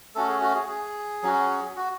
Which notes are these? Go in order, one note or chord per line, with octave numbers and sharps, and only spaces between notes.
A3 C#4 F#4 A4
G#4
F#4
G#4
G#4
F#3 C#4 F#4
F#4